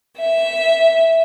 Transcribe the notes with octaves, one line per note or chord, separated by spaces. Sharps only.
E5